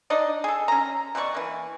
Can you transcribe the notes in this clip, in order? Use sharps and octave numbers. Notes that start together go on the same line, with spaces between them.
D4 D#4 D5 D#5
G#4 A4
C#4 A#5
B2 E3 D5 C#6
E3 A#3